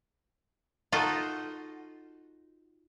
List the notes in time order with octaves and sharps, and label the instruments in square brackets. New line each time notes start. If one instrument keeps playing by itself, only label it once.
[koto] D#4 F4 F#4 A4 D#5